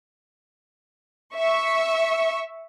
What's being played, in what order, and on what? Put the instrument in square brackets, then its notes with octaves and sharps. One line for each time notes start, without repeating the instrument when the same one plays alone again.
[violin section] E5 C#6